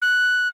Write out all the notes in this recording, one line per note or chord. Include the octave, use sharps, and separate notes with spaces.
F#6